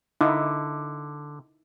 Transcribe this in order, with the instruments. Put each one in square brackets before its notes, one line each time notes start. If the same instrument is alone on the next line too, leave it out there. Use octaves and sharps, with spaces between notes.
[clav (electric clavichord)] D3 [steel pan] D#4 E4